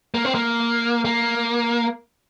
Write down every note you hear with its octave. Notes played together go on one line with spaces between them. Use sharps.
A#3
C4
A#3
A#3